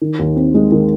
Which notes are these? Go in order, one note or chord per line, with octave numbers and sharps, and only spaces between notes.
D#3
D#2
C4
G#3
D#3